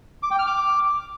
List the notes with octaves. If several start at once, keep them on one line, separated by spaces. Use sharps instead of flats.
D6
G5
F6
D6